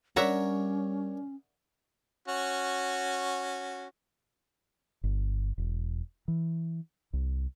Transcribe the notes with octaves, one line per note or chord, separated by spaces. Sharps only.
G3 C#4 D4 A#4 C#5 E5 F#5 A#5
C#4 F#4
G1
E1
E3
C2